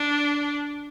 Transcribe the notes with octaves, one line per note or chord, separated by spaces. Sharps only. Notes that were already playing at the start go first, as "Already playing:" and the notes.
Already playing: D4